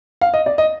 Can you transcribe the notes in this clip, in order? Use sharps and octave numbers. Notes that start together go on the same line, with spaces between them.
F5
D#5
D5
D#5